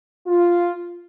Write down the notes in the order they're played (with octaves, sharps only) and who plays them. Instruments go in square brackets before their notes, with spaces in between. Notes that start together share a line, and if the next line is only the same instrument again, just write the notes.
[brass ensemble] F4